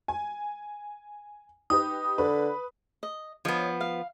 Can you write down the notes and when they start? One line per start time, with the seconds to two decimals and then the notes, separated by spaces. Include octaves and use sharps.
0.08 G#5
1.70 D#4 G4 B4 D#6
2.18 D3 B4
3.03 D#5
3.45 F3 B3 C#5 D#5
3.80 F5